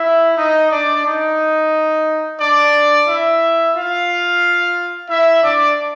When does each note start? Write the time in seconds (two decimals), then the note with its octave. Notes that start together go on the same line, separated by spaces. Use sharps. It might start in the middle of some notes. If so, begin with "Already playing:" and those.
Already playing: E4 E5
0.38 D#4 D#5
0.71 D4 D5
1.06 D#4 D#5
2.40 D4 D5
3.07 E4 E5
3.75 F4 F5
5.09 E4 E5
5.43 D4 D5